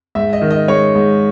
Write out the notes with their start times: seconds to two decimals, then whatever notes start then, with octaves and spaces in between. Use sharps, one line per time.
0.15 G#2 E5
0.33 D#5
0.41 D#3
0.51 D#5
0.68 G#3 C#5
0.95 G#2